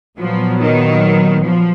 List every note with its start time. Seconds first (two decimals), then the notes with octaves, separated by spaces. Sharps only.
0.18 A#2 F3 F#3 B3
0.60 D#3
1.43 F3